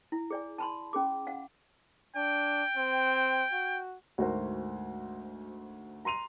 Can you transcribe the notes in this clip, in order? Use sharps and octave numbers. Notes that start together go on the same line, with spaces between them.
E4
G#4 D5 G#5
A5 B5 C6
C#4 G#4 D6
F5 F#5
D4 G5
C4
F#4
D2 G#2 F#4 A#4 C5
A#5 C6 D#7 F7